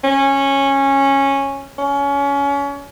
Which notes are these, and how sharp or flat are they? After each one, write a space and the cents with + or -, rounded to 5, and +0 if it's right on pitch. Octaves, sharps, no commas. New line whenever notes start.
C#4 -10
C#4 +25